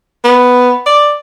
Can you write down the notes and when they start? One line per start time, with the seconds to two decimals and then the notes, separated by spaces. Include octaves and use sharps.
0.25 B3
0.86 D5